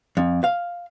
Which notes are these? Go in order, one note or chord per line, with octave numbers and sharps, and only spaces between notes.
F2
F5